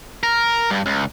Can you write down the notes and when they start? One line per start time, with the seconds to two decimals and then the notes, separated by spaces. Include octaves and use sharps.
0.23 A#4
0.71 G2
0.86 C#2